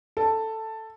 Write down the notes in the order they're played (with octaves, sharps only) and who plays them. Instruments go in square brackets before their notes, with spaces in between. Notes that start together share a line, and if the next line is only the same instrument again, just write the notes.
[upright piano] A4